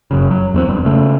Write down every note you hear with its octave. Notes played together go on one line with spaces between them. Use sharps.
F#1 F#2 C#3
F#3
E2 A#3 C4
E1 G2
C#3 A3